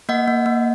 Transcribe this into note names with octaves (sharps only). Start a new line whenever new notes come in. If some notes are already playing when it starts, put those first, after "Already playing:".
A#3 D#5 F#5
A#3
A#3